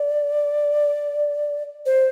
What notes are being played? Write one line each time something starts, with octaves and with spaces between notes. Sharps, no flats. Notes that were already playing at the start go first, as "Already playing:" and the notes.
Already playing: D5
C5